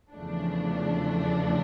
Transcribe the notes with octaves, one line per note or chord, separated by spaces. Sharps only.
E2 C#3 F3 A3 D4